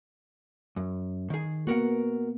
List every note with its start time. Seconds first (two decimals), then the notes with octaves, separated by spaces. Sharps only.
0.76 F#2
1.30 D#3 G#4
1.67 A#3 B3 F#4 A#4 F#5